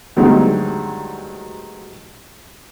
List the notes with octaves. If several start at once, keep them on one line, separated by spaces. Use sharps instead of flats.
D2 G2 D#3 F#3 G#3